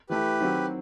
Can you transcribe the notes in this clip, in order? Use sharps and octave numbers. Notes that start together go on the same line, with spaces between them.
E3 A3 E4 G4 B4
D#3 F#3 C4 F#4